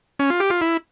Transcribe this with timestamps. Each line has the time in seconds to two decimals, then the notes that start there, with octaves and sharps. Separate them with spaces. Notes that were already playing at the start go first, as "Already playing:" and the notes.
0.19 C#4
0.30 F4
0.40 G4
0.50 F4
0.61 E4